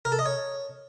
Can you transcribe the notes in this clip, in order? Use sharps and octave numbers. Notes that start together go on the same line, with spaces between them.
A#4
A4
D#5
C#5